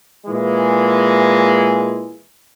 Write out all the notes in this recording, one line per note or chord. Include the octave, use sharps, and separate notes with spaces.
A#2 E3 G#3